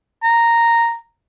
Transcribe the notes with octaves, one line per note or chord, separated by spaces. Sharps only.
A#5